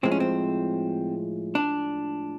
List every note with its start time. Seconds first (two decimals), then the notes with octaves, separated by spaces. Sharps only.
0.03 A2 F3 G#3 C4
0.12 C#4
0.20 C4
1.55 D4